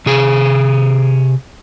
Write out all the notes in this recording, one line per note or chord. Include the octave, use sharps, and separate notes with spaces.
C3 G#4